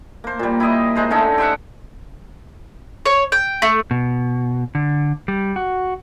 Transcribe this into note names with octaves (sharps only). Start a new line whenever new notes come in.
A#3 C5
A#2 G3
E4 G4 D#5
G#3 C5 A#5
D3 A3 C#4 D#4
G4 C5 E5 F#5
C#5
G5
A3
B2
D3
G3
F#4